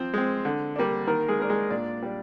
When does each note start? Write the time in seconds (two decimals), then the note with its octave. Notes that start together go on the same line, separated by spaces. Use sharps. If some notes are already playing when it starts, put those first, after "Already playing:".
Already playing: F3 C4 C5
0.14 G#3 C4
0.45 D3
0.76 G3 A#3 D4
1.07 D#3 A#3 A#4
1.28 G#3 G#4
1.40 A#3 D4 A#4
1.50 G#3 G#4
1.70 A#2 D4 D5
2.03 G3 D4